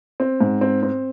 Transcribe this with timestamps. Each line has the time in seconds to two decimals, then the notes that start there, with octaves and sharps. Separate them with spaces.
0.20 C4
0.41 G#2
0.61 C4
0.83 C4